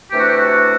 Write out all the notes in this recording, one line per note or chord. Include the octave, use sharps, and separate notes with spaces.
C3 E3 A3 D4 G4
F#4
G4
F#4